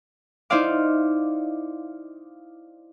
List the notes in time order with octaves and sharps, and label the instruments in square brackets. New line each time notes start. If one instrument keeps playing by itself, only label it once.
[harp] D#4 E4 C5 D5 F5 D6